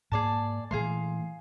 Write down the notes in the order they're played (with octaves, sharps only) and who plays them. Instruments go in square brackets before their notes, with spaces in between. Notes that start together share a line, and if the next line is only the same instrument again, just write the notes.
[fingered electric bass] G#2 A#3 [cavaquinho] G#4 D5 A5
[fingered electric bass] A#2 E3 A3 [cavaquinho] G#4 F5 C6